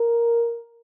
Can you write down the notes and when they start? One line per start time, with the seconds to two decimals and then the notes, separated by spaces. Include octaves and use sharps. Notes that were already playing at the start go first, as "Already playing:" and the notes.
Already playing: A#4